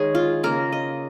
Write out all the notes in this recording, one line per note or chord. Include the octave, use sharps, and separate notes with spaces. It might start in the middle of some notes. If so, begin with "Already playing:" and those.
Already playing: D#3 G#3 G#4 C#5
F4
C#3 A#3 A#4
D#5